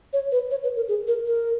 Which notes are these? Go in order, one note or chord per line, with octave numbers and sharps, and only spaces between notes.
C#5
B4
C#5
B4
A#4
G#4
A#4
A#4